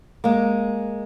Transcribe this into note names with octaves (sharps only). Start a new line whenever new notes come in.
G#3 A#3